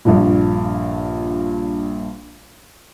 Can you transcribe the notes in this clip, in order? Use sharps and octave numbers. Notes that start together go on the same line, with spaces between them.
A#1 G2 A#2